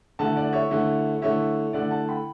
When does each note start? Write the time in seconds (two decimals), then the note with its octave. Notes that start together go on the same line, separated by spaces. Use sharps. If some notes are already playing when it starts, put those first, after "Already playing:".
0.19 D3 A3 E4 F#5 A5
0.36 D5 F#5
0.53 C#5 E5
0.71 D3 A3 E4
1.22 D3 A3 E4 C#5 E5
1.73 D3 A3 E4 D5 F#5
1.91 F#5 A5
2.08 G5 B5